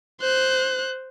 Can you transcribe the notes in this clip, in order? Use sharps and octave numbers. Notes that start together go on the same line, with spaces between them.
C5 F#6